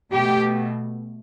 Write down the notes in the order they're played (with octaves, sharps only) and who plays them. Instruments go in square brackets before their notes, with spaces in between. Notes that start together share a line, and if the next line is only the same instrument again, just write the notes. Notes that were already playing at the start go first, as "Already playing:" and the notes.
[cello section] B2 A3 G4